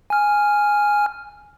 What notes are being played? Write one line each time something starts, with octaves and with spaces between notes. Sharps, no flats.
G#5 F6